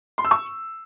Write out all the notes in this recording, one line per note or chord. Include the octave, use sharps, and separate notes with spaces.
C6
E6
C#6